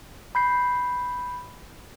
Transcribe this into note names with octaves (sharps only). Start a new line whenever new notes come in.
B5 G6 C7